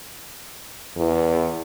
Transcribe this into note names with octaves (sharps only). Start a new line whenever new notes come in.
E2